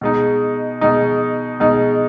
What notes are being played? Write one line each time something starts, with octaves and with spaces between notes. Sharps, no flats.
B2 G#3 D#4
B2 G#3 D#4
B2 G#3 D#4